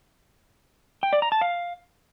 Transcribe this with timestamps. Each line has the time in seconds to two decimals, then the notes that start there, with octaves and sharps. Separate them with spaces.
1.03 G5
1.13 D5
1.22 A#5
1.32 A5
1.41 F5